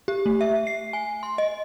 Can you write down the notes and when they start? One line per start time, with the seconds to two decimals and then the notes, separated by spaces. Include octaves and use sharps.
0.08 G4
0.26 A3
0.41 E5
0.67 C7
0.93 G#5
1.23 C6
1.38 D#5